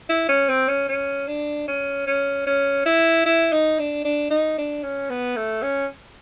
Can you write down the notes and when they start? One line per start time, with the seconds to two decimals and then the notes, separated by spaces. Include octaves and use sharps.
0.09 E4
0.29 C#4
0.49 C4
0.68 C#4
0.89 C#4
1.27 D4
1.68 C#4
2.07 C#4
2.46 C#4
2.86 E4
3.26 E4
3.52 D#4
3.79 D4
4.05 D4
4.30 D#4
4.58 D4
4.83 C#4
5.10 B3
5.36 A3
5.62 C#4